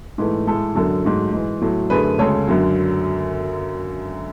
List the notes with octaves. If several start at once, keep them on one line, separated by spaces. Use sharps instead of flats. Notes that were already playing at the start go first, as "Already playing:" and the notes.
G#2 E3 A3
A2 G#3 A4
F#2 D3 F#3 A4
G#2 F#3 A3
G#2 E3 G#3
A2 F#3 A3
F#2 D3 A3 G#4 B4
D2 C#3 G#3 A4 C#5
F#2 D3 F#3